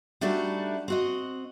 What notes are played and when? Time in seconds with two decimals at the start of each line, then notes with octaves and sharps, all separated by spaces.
0.21 G3 A3 D4 D#4 F#4
0.88 C4 F#4 D#5